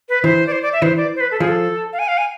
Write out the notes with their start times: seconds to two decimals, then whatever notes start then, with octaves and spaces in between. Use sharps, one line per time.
0.09 B4
0.24 E3 C5
0.47 D5
0.52 C5
0.62 D5
0.73 E5
0.82 E3 C5
0.97 D5
1.15 C5
1.20 B4
1.31 A4
1.40 F3 G#4
1.48 A4
1.93 F5
1.99 G#5
2.08 F5
2.18 G#5